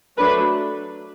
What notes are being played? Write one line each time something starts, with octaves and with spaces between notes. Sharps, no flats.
F#3 A3 D4 B4